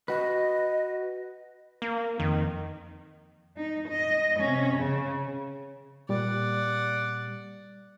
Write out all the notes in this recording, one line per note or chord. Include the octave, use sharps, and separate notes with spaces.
F#4 B4 D#5
A#3
F2 D#3
D#4
D#5
C3 C#4
C#3
A#2 G3 D5 F#5